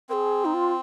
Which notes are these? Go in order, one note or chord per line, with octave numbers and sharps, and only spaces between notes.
C4 G#4 A#4
D#4
F4